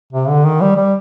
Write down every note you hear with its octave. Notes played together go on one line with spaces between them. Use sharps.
C3
D3
D#3
G3
G3